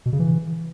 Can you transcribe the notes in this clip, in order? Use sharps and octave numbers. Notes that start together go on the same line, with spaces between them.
B2
C#3
E3